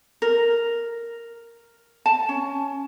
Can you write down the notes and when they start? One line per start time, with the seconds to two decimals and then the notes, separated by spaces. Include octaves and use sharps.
0.22 A#4
2.06 A5
2.29 C#4